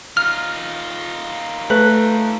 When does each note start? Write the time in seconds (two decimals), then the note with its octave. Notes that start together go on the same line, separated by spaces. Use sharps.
0.17 D#4 F4 F6
1.70 A3 B4